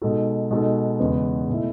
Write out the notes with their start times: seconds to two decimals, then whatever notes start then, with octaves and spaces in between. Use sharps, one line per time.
0.02 B2 G#3 D#4 F#4 A4
0.51 B2 G#3 D#4 F#4 A4
1.00 E2 C#3 G#3 B3
1.49 B2 A3 E4